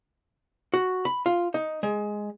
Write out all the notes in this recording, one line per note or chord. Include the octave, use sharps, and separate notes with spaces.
F#4
B5
F4
D#4
G#3